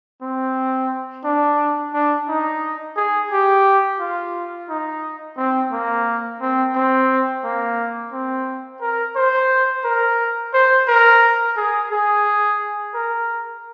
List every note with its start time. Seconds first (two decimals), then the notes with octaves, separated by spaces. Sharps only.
0.22 C4
1.24 D4
1.94 D4
2.28 D#4
2.96 G#4
3.31 G4
4.00 F4
4.69 D#4
5.37 C4
5.72 A#3
6.41 C4
6.75 C4
7.44 A#3
8.12 C4
8.81 A#4
9.16 C5
9.84 A#4
10.54 C5
10.88 A#4
11.57 G#4
11.91 G#4
12.94 A#4